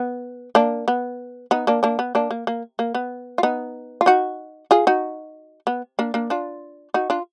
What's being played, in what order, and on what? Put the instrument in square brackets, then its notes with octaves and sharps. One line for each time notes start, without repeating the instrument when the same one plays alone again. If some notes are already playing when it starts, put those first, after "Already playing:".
Already playing: [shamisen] B3
A#3 D4
B3
B3 D#4
A#3 D4
A#3 D4
B3
A#3 D4
A#3
A#3
A#3
B3
F4
B3 D#4
F4
D#4 F#4
F4 G#4
D#4 F#4
B3
A#3 D4
A#3 D4
D4 F4
D#4 F#4
D4 F4